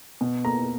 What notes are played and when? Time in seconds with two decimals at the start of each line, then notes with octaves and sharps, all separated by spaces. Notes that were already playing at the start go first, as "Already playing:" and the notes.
0.21 B2
0.45 A#3 A#5